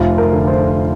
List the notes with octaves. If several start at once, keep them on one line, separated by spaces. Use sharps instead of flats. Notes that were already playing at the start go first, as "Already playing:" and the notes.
Already playing: F1 F4
A#4
D3
C5